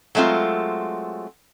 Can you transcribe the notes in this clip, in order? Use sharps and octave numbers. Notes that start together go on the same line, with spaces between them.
F#3 G#3 A3 C4 F4